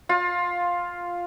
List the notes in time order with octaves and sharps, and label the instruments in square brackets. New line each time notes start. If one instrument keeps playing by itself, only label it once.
[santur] F4